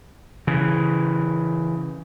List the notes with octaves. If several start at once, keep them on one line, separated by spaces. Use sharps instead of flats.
C#3 E3